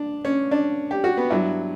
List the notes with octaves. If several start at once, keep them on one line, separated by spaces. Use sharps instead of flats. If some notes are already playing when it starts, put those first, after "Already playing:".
Already playing: D4
C#4
D4
G4
F#4
B3
G2 F#3 E4